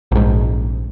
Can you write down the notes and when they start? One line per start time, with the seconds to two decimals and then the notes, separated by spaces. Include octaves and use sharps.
0.12 A#1 G#2